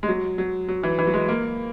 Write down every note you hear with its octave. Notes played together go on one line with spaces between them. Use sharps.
G#3
F#3
F#3
F#3
E3
E3
F#3
G#3
A#3